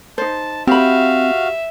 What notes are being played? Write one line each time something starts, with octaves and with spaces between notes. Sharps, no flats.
D#4 C5 A5
C4 F#4 G4 E5 F5 B5